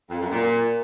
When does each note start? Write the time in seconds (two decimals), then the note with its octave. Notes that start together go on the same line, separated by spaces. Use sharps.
0.10 F2
0.20 F#2
0.31 A#2